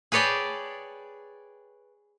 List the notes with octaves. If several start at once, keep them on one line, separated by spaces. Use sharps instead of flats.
G#4 B4 C#5 D5 G5 A5